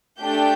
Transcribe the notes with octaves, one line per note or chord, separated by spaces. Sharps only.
A3 D4 G4 G6